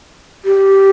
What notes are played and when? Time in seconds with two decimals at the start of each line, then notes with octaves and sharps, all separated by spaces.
0.45 G4